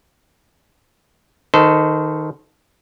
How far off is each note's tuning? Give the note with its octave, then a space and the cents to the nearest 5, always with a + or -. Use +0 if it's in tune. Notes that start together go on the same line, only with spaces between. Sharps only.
D#3 +0 A4 +0 C5 -35